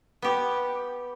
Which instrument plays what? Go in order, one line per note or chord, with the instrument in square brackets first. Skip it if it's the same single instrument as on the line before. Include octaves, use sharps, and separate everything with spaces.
[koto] B3 G4